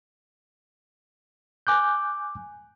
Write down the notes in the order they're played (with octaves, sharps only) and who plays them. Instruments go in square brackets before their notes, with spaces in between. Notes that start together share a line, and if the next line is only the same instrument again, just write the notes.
[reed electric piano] G#5 D6 F#6 G6